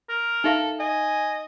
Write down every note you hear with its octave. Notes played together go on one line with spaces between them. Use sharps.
A#4
D#4 A4 E5 F5
D#5 G#5